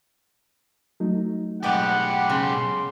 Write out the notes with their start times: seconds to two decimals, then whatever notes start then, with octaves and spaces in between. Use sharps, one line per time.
1.00 F#3 A3 D#4
1.63 B1 G#3 B3 G4 D5 F#5
2.30 C#3 C6